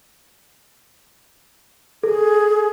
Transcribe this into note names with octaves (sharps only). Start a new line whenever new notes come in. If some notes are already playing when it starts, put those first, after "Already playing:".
G#4 A4